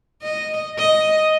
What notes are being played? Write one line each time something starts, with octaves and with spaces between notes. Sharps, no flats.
D#5
D#5